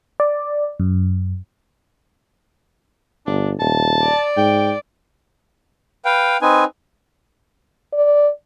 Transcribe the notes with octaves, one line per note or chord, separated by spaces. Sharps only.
D5
F#2
G1 D4
D#1 A5
D5
G#2 G5
B4 F5 G5
C4 D#4 B4 G#5
D5